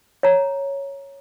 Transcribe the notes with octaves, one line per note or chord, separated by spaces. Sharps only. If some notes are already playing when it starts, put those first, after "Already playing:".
C#5 A#5